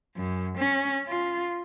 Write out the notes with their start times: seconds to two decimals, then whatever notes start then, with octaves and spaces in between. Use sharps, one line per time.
0.16 F#2
0.58 C#4
1.08 F4